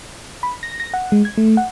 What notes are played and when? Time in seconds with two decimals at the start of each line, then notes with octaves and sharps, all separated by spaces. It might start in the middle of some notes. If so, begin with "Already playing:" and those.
0.43 B5
0.63 A#6
0.80 A#6
0.94 F#5
1.12 G#3
1.25 G#6
1.37 A3
1.57 F#5